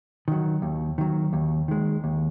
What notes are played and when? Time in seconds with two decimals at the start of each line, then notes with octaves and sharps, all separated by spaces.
0.28 D#3 F#3
0.62 D#2
0.98 D#3 F#3
1.33 D#2
1.68 D#3 G#3
2.04 D#2